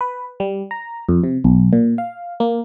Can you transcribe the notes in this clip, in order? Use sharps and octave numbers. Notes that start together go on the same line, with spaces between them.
B4
G3
A#5
F2
C3
B1
A#2
F5
A#3